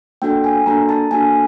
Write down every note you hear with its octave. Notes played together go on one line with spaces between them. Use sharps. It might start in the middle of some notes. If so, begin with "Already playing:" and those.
A#3 D4 F#4 A4 G5
G#5
A#3 D4 F#4 A4 A#5
A5
A#3 D4 F#4 A4 G#5